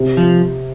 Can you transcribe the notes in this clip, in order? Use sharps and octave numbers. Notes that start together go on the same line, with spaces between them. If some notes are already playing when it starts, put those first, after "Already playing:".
Already playing: C3
F3